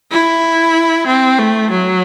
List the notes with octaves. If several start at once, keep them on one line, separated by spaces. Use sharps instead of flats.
E4
C4
A3
F#3